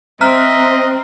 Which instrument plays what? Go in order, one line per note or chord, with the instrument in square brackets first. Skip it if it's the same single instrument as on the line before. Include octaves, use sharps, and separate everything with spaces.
[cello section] C4 [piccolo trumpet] D#5 [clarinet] E5 [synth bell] A#5 F6 F#6